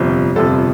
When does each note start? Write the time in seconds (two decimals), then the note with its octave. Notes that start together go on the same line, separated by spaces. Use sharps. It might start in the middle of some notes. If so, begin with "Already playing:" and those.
Already playing: G1 F2 C3 F3
0.36 G1 F2 C3 F3 A4